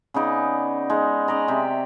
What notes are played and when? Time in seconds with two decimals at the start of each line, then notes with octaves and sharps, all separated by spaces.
0.14 C#3 B3 D#4 D5
0.90 G#3 D#4
1.28 C#4 D5 D#5 A#5
1.48 C3 E5 G5